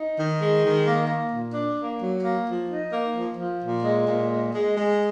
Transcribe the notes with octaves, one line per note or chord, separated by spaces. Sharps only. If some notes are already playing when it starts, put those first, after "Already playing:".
Already playing: D#4
D#3
G#3
D#3
A#3
A#3
A#2
D4
A#3
F#3
A#3
F3
D#4
A#3
F3
F3
A#2
G#3
A#2
G#3
G#3
G#3